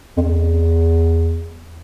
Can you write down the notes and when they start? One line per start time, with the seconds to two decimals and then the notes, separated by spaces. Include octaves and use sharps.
0.17 F2
0.21 E2